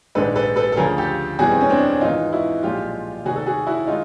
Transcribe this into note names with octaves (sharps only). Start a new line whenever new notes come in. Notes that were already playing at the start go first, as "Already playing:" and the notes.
A#1 G#2 D#3 G#3 A4 B4
A4 B4
A4 B4
A4
D2 C#3 F3 G#4 A#4
G4 A4
E2 B2 G3 F#4 G#4
C4
C#4
C4 D4
G#1 G#2 E3 D#4 F4
E4 F#4
B1 A#2 F3 G#3 F4 G4
F1 D#2 D#3 F#4 G#4
A4
F#4 G#4
E4 F#4
D#3 G#3 D#4 F4